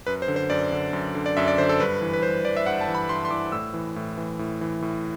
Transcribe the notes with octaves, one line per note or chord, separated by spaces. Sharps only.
F#2 B4
C5
D3
C5
F#2 D5
D3
F#2
D3
D5
F#2 E5
D5
D3 C5
A4
G2 B4
E3
B4
G2 C5
E3 D5
E5
G2 F#5
A5
E3
B5
G2 C6
C6
E3 D6
A2 E6
E3
A2
E3
A2
E3
A2